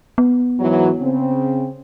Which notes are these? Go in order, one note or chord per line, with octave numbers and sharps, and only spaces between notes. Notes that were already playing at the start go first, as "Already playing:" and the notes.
B3
G#2 E3 F#3
C#3 C4